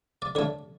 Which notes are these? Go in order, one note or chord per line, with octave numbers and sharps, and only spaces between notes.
D5
D3 A3 C#5